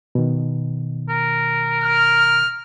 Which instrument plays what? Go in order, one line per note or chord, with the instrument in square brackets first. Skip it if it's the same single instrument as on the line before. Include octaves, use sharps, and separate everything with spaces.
[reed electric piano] B2 D#3
[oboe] A#4
[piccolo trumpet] F6